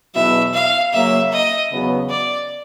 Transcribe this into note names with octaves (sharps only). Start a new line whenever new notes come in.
E2 B2 F#3 B3 E4 E5
F5
C#3 F#3 A#3 E5
D#5
E2 C#3 F#3 B3
D5